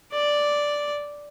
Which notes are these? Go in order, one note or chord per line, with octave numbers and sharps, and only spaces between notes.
D5